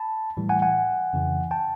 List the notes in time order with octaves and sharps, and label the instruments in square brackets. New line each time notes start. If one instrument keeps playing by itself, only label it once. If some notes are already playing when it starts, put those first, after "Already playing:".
Already playing: [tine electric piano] A5 B5
A2 E3 G3
F#5 G#5
F#5 G#5
F2 C#3 E3
G5 A5